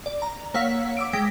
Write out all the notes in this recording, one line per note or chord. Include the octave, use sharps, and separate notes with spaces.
D5
A#5
A#3 C#5 F5 F#5 E6 B6
D6 E6 D7
G#3 G5 A#6 B6 D7